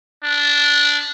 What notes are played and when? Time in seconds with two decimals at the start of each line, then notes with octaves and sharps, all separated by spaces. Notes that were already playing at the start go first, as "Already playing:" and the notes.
0.23 D4